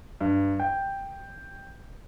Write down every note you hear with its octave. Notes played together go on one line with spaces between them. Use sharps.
G2
G5